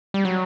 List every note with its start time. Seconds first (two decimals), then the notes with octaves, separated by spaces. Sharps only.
0.14 G3
0.25 F#3